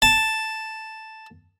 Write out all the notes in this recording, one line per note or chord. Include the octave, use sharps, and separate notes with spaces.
A5